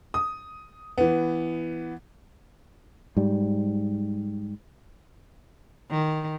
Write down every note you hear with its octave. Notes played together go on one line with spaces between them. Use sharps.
D#6
E3 B3
G#2 G3
D#3